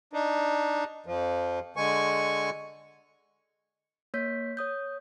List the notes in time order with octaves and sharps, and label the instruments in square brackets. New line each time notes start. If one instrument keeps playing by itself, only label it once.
[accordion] D4 D#4
F2 F3
D3 G#3 G#5 C#6
[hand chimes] A#3 C#5 G6 B6
C#5 D#6 G6